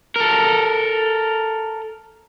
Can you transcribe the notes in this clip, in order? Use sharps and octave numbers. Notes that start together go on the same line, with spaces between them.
A4 A#4